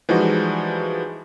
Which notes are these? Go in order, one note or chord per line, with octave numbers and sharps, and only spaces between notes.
E3 F3 G3 G#3 D#4 F#4